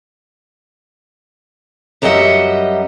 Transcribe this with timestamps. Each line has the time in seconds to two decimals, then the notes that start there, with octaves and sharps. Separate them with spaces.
2.02 F#2 F#3 G3 D#5 E5 F#5